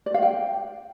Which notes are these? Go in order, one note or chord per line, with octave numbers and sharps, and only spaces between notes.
D5
F5
G5